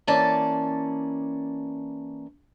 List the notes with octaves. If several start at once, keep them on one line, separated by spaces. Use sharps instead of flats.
E3 A#3 C#4 D5 A5